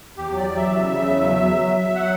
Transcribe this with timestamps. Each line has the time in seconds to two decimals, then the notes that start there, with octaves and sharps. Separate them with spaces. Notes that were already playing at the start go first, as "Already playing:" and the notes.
0.17 E2 G4
0.31 F#3
0.37 D5
0.47 F#3
0.57 E2 E5
0.76 C#3
0.91 C#3
1.06 E2
1.21 F#3
1.36 F#3
1.51 F#3
1.66 F#3
1.80 F#3
1.95 F#3 F#5